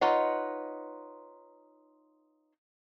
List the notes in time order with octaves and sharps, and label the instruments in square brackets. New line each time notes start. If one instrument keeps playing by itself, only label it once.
[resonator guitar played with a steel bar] D#4 F4 B4 C#5 D#5 F#5